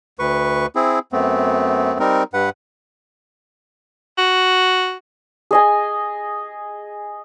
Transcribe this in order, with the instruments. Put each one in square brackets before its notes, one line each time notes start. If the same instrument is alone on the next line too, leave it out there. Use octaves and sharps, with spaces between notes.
[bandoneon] D2 B4 C#6
C4 E4 G#4
F#2 A3 B3 C4
G3 C4 D#4 A#4
G2 B4 F#5
[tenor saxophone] F#4
[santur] G#4 D#5 G#5